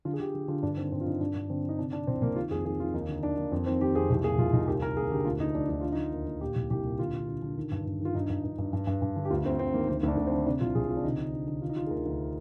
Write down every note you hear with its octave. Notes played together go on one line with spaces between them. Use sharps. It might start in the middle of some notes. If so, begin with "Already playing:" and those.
D3 F4
G#4
D3 G4
D3
D3 F4
G2 D4
D#3 C4
G2 C4
F4
G2 D#4
G2 D4
G2
D3 C4
D3
D#4
C3 D4
C3 D4
C2 C4
C2 A#3
D#3 F4
F2 G#4
D#3 G#4
D#3 F4
D#2 D#4
D3
D#2 D4
D#2
F2
D#3 C4
D#3 G4
F2 G#4
C2 G4
A#2 G#4
C2 F4
C2 D#4
D#2 G4
D#2 A#4
D#2 G#4
D3 G4
D2 F4
D2 D#4
D2 D4
D2 D#4
D3 F4
D#4
D3
D#2
D#2
A#2 G4
C2
C2 G4
A#2
D3 F4
D3
D3
D3
D#3
G2
G2
D#3 F4
G2 D#4
G2
G2
G2
G2
G2
G2
D3
G4
D2 F4
D2 C4
D2 C4
D#3 A#3
D2 C4
D2 D4
D2
C4
D3
C3 D4
C2 F4
C2 G#4
C3 F4
D4
D3 D#4
D3
D3
D3
D#3 F4
D#4
D#3 F4
G#4
D2 A#4
D2